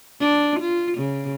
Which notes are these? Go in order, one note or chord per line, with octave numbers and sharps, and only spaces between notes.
D4
F4
C#3